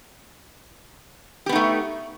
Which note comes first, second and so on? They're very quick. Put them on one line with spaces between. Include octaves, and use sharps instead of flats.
G4 B3 D#4 A3